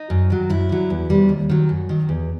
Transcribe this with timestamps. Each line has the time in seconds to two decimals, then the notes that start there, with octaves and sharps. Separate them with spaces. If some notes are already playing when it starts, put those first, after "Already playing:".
Already playing: D#4
0.10 F#2
0.30 D#3 F#3
0.50 F#2 E4
0.69 D3 F#3
0.90 E2
1.10 C3 E3 G3
1.29 D#2
1.49 D#3 F#3
1.69 F#2
1.89 D#3 F#3
2.09 E2